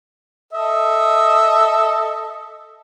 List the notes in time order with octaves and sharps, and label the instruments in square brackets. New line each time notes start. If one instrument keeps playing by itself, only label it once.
[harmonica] A4 D#5 E5